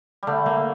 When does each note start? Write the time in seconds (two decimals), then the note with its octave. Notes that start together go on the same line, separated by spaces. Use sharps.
0.23 D3 G3 A3
0.46 A#3